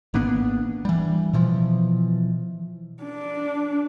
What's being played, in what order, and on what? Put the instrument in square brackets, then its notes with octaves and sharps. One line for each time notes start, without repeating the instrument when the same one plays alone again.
[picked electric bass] G#1 A#3 B3 D4
E3 G3
B2 E3 F3
[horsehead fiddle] D4